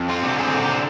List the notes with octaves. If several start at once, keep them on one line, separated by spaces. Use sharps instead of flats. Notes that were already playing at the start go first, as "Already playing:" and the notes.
Already playing: F2
C4 F4
D3 G4
C4 G#4
D3 G4
C4